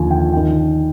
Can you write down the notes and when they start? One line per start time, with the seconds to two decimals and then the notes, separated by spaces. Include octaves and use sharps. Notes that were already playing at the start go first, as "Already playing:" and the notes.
Already playing: D#2 D3 F3 G#5
0.11 G5
0.33 D#3 G5